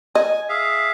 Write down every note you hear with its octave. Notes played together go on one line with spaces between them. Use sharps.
D#5 G#5
G#4 E5 F5